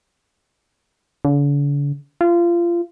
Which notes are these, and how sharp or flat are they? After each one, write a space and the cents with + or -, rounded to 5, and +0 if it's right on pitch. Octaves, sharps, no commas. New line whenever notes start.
D3 -45
F4 -25